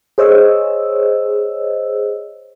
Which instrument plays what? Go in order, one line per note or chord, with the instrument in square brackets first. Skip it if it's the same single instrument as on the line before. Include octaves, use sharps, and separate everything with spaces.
[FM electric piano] G#4 C5 C#5 D#5 E6